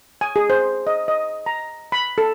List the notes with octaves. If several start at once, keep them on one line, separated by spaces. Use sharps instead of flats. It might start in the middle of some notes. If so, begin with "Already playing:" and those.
G#5
G#4
C5
D#5
D#5
A#5
B5
A4